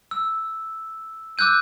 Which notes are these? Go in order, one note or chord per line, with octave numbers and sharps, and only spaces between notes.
E6
D6 E6 F#6 G6 D#7